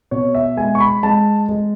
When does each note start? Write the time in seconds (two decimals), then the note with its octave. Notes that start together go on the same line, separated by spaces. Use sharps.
0.11 B2 C#5
0.35 E5
0.57 G#3 G#5
0.75 C#6
0.80 B5
1.03 G#3 A5
1.49 G#3